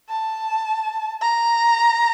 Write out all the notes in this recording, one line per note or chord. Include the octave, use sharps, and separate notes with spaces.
A5
A#5